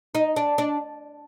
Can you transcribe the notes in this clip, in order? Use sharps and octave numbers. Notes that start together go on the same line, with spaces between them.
D#4
D4
D4